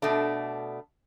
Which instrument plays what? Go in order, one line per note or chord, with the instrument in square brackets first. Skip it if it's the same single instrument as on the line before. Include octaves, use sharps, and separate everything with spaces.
[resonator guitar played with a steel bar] B2 A3 D4